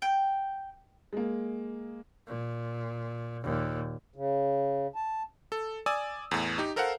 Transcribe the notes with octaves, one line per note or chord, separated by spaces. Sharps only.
G5
G#3 A#3
A#2
D#2 A#2
C#3
A5
A4
D5 G#5 D#6 E6
E2 A2
D#4 G4
A4 A#4 C5 F5 F#5